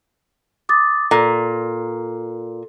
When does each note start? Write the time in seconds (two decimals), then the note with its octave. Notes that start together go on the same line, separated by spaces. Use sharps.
0.69 D6 D#6 A6
1.11 A#2 A4